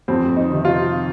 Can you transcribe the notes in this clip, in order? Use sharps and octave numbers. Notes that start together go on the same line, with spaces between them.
F2 C4
D#4
C3 D#3
F4